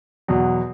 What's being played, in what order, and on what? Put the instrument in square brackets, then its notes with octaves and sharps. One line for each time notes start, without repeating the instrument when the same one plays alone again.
[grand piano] E2 B2 F#3